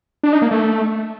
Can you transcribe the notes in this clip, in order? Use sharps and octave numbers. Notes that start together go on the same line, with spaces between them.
D4
D#4
A#3
A3